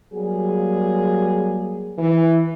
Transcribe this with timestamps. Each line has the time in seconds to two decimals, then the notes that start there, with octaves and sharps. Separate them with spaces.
0.14 F#3 G3 A#3 G#4
1.98 E3